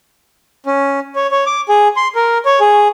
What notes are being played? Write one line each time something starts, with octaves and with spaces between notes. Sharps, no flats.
C#4
C#5
C#5
D6
G#4
C6
A#4
C#5
G#4